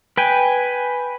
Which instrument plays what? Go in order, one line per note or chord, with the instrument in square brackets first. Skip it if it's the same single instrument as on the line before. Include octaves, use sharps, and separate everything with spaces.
[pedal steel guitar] B4 G5 G#5